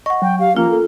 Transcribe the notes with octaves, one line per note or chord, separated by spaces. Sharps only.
D#5 F#5 C#6
F#3 G5
G4 F5
F3 A#3 C#4 F4
A4